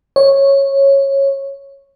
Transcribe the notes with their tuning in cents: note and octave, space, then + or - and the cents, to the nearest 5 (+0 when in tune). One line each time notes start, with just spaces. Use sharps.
C#5 -10